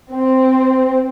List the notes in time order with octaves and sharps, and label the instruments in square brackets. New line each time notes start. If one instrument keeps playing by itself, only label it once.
[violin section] C4